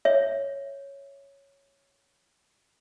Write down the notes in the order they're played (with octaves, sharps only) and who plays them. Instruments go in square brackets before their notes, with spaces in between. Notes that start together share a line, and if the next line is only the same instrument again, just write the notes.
[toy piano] C#5 E5